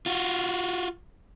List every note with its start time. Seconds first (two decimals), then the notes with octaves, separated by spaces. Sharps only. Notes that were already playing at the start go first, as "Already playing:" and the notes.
0.06 F4 F#4